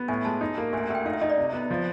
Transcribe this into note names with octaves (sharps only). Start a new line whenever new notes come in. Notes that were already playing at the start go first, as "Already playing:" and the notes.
Already playing: B3
A2 G#5
G#3 A5
D#4
A#3
D2 G#5
G#5
D2
G5
D#4 F5
E5
D#4 D#5
D5
C3
B3
F3